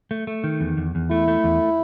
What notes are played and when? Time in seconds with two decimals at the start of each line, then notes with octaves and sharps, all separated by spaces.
0.11 A3
0.27 A3
0.44 D#3
0.61 E2
0.77 E2
0.95 E2
1.10 A3 E4
1.28 A3
1.44 E2